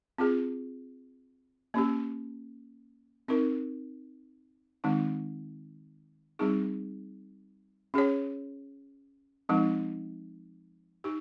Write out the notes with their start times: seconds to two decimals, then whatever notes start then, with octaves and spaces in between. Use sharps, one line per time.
0.18 C4 F4 G#4
1.74 A#3 C#4 G4
3.28 C4 D#4 A#4
4.84 D#3 G#3 C4 D#4
6.39 G3 C4 D#4 G#4
7.94 C#4 G#4 C#5
9.49 F3 G#3 C4 D#4
11.04 D#4 G4